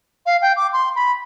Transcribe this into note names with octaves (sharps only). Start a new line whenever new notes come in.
F5
G5
D6
C6
B5